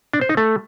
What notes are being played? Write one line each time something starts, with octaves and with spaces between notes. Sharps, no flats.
D4
C5
D#4
A3